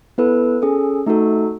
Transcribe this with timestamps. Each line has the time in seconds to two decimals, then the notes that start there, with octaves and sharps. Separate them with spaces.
0.18 B3 E4 A4 B4
0.62 C#4 G#4 A4
1.06 A3 D#4 F#4 A4